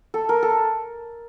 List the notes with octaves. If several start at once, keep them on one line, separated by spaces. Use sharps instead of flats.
A4
A#4
A4